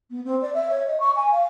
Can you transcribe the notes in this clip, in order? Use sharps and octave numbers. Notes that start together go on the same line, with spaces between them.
B3
C4
D5
E5
C#5
D#5
C#6
G#5
F5